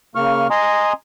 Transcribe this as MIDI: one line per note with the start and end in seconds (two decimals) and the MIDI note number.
0.15 0.47 49
0.15 0.47 58
0.15 0.47 85
0.15 0.47 89
0.51 0.93 75
0.51 0.93 80
0.51 0.93 82
0.51 0.93 84
0.51 0.93 87